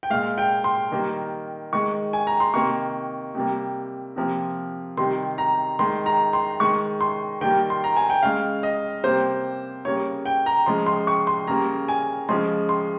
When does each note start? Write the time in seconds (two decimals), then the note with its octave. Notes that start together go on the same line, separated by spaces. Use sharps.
0.03 G5
0.10 A#2 G#3 F5
0.38 G5
0.64 C6
0.92 D#3 G3 A#3
1.73 D#3 G#3 C#6
2.13 G#5
2.27 A#5
2.40 C6
2.54 C3 D#3 A#3 C#6
3.35 C3 G3 A#3
4.16 C3 F3 A#3
4.97 C3 D#3 G3 C6
5.38 A#5
5.79 D#3 G#3 C6
6.06 A#5
6.33 C6
6.60 D#3 G#3 C#6
7.01 C6
7.41 D#3 G3 A#3 G5
7.70 C6
7.84 A#5
7.96 G#5
8.10 G5
8.23 C#3 G#3 F5
8.63 D#5
9.03 C3 G3 A#3 C5
9.85 C#3 G3 A#3 C#5
10.25 G5
10.46 A#5
10.66 C#3 F3 G#3 C6
10.86 C6
11.07 C#6
11.27 C6
11.47 C#3 G3 A#3 A#5
11.88 G#5
12.29 C#3 F3 G#3 C6
12.69 C6